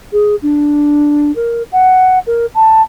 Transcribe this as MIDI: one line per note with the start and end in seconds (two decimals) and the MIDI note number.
0.12 0.35 68
0.42 1.34 62
1.35 1.63 70
1.72 2.19 78
2.26 2.46 70
2.55 2.81 81